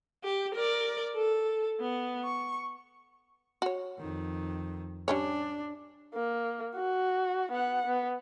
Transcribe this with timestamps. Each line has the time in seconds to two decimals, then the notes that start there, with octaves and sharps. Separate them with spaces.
0.24 G4
0.55 A#4 D5
1.16 A4
1.80 B3
2.24 C#6
3.62 F#4 C#5
3.98 F2 D#3
5.08 G3 C#4 D4 C#5
6.15 A#3
6.76 F#4
7.52 B3 F#5
7.86 B3